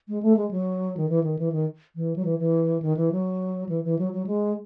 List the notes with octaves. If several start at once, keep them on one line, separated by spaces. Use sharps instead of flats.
G#3
A3
G#3
F#3
D#3
E3
D#3
E3
D#3
E3
F#3
E3
E3
D#3
E3
F#3
E3
E3
F#3
F#3
G#3